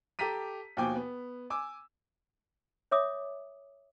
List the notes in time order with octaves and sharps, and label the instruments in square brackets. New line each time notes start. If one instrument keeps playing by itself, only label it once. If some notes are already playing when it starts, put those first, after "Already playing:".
[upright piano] G4 A4 A#5 B6 D#7
D#2 B2 F3 G5 G#5 D6
B3
G#5 D6 E6
[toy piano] C#5 E5 D6 D#6